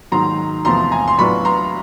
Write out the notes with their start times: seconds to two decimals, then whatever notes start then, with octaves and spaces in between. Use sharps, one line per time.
0.12 G#2 D#3 F#3 A#5 C6
0.65 E2 C3 F3 A3 A#5 C6
0.92 G#5 A#5
1.08 C6
1.18 A2 F#3 B3 D4 F4 B5 C#6
1.45 A#5 C6